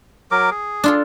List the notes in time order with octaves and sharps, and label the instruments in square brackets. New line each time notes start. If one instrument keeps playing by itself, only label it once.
[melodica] F#3 A#4 D6
G#4
[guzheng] D4 F4 A4